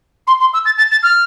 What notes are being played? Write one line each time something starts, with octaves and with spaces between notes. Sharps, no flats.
C6
C6
E6
A6
A6
A6
F6